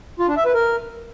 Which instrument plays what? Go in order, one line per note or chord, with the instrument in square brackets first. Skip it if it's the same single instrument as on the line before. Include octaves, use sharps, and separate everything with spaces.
[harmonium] F4
D4
E5
B4
A#4